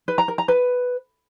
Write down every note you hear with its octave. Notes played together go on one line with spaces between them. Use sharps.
B4
A#5
A#4
A#5
B4